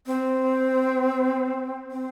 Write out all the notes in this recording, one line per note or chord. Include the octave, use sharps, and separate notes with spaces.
C4
C4